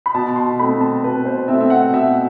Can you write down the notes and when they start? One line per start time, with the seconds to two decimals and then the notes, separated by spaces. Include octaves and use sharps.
0.06 B5
0.14 B2 A5
0.36 C6
0.59 A3 C4 B5
0.81 A5
1.04 B2 B4
1.25 C5
1.48 A3 C4 E5
1.61 E5
1.70 F#5
1.93 B2 E5